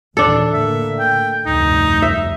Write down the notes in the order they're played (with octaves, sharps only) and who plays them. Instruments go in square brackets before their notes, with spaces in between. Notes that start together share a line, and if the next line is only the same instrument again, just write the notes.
[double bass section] D#2 A#2 E3 [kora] D4 A4
[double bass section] A2 D3 A#3 [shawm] E5
[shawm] G5
[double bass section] F1 D2 G2 [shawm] D#4
[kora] E5